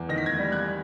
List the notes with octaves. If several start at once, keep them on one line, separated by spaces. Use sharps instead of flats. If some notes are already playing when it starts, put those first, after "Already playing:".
Already playing: E2
D#3 A#6
B6
G#6 A#6
G3
F#6 G#6